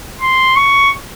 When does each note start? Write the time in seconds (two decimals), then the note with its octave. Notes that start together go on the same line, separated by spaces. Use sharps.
0.21 C6
0.56 C#6